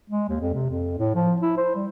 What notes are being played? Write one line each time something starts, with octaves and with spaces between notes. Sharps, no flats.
G#3
D#2
F2
C3
F2
A2
F3
E4
C5
G3